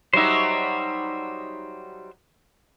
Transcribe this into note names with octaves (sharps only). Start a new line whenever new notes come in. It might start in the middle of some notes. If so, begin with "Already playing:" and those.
F#3 G3 D#4 C5 E5